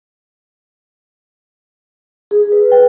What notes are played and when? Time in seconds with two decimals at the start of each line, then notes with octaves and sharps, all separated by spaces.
2.31 G#4
2.52 B4
2.72 G5